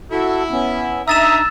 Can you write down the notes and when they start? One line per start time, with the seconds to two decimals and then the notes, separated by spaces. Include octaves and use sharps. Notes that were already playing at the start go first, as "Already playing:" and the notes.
0.11 E4 F#4 A4
0.51 B3 C#4
1.08 D4 D#4 E5 A#5 D#6 E6 A6 E7